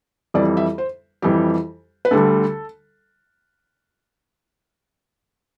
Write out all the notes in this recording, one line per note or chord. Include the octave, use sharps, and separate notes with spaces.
F2 E3 G3 D5
E5
C5
F2 E3 G3 G4
B4
D2 D3 G3 A4